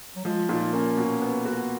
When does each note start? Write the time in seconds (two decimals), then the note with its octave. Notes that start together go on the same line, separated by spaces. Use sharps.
0.16 F#3
0.25 F3 G#3
0.49 A#2 D#4
0.73 A#3 C#4
0.97 B2
1.22 B3
1.45 F#4